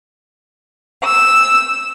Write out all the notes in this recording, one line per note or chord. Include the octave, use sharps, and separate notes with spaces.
E6